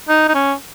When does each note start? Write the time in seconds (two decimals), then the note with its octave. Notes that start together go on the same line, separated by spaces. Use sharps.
0.09 D#4
0.28 D#4
0.35 C#4